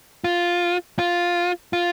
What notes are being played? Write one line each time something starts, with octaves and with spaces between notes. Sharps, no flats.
F4
F4
F4